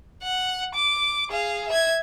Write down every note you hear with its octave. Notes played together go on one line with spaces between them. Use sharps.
F#5
D6
G#4 F5
E5 G#6